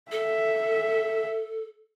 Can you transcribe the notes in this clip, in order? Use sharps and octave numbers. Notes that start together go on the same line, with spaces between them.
A4 E5